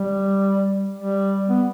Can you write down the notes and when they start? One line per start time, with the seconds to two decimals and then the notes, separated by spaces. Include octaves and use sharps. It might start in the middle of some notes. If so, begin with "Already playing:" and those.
Already playing: G3
0.96 G3
1.49 B3